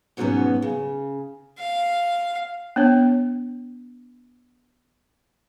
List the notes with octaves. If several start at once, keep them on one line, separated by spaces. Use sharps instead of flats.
G#2 B2 F#3 A3 B3 C#4
C#3
F5
B3 D4 C#5